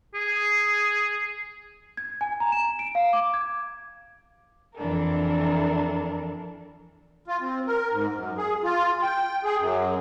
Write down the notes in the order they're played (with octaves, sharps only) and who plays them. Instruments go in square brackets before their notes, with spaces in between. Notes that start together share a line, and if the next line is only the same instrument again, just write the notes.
[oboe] G#4
[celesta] G#6
G#5
A#5
E7
D7
F5
D6
G#6
[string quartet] F2 E3 D4 A4 A#4
[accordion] F4
C4
A#4
G#2
F#2
G#4
F4
G5
G#4
F#2